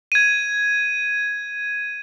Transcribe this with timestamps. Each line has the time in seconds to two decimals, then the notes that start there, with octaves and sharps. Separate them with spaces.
0.12 G#6 D#7